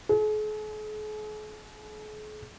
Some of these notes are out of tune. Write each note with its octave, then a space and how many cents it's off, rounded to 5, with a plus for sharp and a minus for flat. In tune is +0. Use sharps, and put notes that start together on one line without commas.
G#4 +45